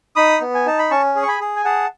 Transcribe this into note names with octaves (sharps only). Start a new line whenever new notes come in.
D#4 B5 D#6
B3
G#5
D#4 A5
B5
C#4 A5 C#6
G#4
C#6
G#5 B5
G#4
G#5
G#4 F#5 A5